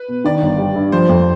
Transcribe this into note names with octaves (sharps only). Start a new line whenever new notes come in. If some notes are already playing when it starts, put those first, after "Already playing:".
Already playing: B4
B2
D#3 D5
G1
G3
G2
F3 C5
F2